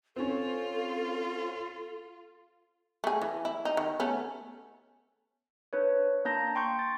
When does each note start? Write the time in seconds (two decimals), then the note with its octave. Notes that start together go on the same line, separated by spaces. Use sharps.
0.16 C4 C#4 F4 A4
3.04 A3 G#4
3.22 E3
3.45 E4
3.65 D#4
3.77 D#3
4.00 A3 B3 C#4
5.73 D4 B4 C#5
6.25 A#3 D4 A5 A#5 G6 A#6
6.55 G5 C6 C#6 G6
6.79 A6